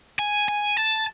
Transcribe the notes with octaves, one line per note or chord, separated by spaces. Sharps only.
G#5
G#5
A5